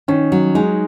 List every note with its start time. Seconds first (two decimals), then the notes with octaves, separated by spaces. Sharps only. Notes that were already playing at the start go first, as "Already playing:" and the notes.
0.08 D#3 C#4
0.32 F#3
0.55 G#3 D#4